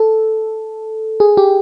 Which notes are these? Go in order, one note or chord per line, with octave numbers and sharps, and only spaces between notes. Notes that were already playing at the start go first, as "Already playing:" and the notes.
Already playing: A4
G#4
G4